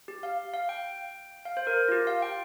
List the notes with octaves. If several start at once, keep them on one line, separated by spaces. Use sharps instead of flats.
G4
F5
F5
G5
F5
C5
A#4
F4
G4
F5
G5